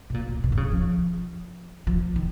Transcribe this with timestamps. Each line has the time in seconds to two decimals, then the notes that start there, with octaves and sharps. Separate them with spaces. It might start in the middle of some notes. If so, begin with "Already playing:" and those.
0.10 B2
0.14 A#2
0.29 A#2
0.44 B2
0.52 D#3
0.57 C#3
0.71 F3
1.87 F3
2.16 D#3